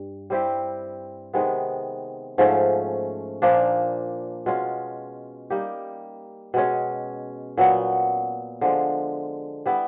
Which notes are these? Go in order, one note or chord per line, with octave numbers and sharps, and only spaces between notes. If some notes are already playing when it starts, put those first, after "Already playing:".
Already playing: G2
G3 C4 E4 G4
C3 D#3 G#3 B3
G#2 F3 A3 C#4
A#2 F3 A#3 D4
B2 G#3 C#4 F4
G3 A#3 D#4 G4
B2 G#3 C#4
A#2 F#3 B3
D3 F3 G#3
G3 B3 E4